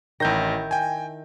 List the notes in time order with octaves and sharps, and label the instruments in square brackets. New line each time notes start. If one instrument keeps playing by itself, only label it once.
[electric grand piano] A1 G6 A#6 [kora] D#3 E4
[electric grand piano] G5 G#5